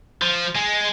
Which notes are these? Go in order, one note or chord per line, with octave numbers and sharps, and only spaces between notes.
F3
G#3